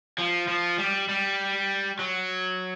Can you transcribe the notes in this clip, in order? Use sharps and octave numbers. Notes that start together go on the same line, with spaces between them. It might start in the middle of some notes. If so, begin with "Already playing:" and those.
F3
F3
G3
G3
F#3